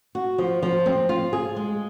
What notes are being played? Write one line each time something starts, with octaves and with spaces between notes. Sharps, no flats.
F#4
F3
F3
C4
F4
G#4
G#3